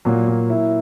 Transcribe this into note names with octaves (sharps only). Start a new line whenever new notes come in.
A#2 F#3 A#3
A#2
E4